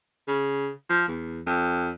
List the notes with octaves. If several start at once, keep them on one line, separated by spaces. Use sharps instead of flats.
C#3
F3
E2
F2